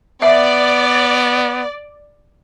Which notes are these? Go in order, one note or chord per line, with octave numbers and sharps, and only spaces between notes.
B3 D5 E5